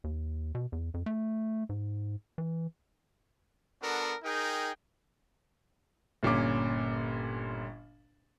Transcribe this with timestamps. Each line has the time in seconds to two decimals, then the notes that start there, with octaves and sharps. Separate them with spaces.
0.04 D#2
0.55 B2
0.72 E2
0.94 F2
1.06 A3
1.69 G#2
2.38 E3
3.82 B3 D4 F#4 A4 A#4
4.24 D#4 G#4 A#4 G5
6.23 G1 A#2 C#4 D6